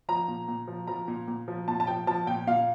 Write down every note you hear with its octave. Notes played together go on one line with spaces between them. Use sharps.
F3 A#5
A#2
A#2
F3
F3 A#5
A#2
A#2
F3
A#2 A5
A5
F3 G5
F3 A5
A#2 G5
A#2 F5